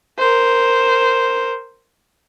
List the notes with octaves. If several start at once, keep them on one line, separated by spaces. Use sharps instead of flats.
A#4 C5